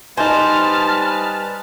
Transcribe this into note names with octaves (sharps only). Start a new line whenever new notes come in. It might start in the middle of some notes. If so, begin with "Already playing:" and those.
G3 D#4 B4 C5 D#5 G#5 A5 F6